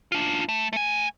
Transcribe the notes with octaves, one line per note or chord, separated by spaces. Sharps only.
D4 F4
A3
A3 G#5